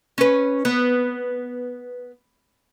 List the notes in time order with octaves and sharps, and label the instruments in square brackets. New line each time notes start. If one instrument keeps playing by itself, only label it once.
[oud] C#4 B4
B3